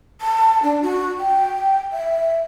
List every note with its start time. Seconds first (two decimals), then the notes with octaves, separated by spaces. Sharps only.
0.21 A5
0.63 D4
0.82 F#4
1.19 G5
1.93 E5